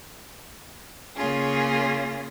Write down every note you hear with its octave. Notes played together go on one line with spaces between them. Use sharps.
C#3 A#3 C#4 F4 G#4